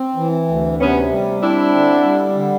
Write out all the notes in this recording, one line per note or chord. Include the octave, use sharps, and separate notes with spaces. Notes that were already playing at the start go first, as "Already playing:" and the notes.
Already playing: C4
E3
D2
C3 B3 C#4
G3
C4 D4 E4
D3
G3
D3